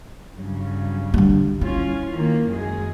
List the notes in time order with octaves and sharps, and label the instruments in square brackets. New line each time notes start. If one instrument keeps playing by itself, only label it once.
[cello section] G2 C#3 F#3
[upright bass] D3 G3
[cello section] C#4 F4 [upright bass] E4
[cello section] D#3 A#3
F#2 G#3 G#4